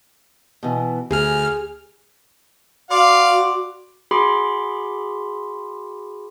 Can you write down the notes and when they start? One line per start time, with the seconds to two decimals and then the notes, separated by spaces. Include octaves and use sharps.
0.63 B2 E3
1.11 D2 G#4 F6
2.91 F#4 D5 F5 C6 D6
4.11 F#4 G#4 B5 C6 D6